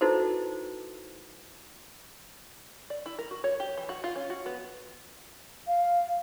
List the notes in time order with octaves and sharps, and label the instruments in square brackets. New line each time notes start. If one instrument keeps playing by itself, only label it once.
[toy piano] D#4 E4 F#4 A4 B4 C5
[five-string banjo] D5
E4
A#4
F#4
C#5
G4
E3
F#4
F4
C#4
F#4
B3
[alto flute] F5